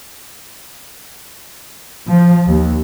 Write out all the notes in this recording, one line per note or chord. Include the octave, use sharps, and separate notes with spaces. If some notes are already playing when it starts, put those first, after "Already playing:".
F3
D#2